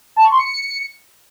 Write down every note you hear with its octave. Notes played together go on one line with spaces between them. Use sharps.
A5
C#6
C6
C#7